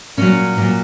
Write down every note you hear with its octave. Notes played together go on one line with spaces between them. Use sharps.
A#2 F#3 C#4
A#2 F#3